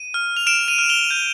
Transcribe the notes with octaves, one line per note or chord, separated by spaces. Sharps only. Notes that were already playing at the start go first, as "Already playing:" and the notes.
Already playing: D#7
F6
F7
F6 D7 E7
D#7 F7
F6
F7 G7
G6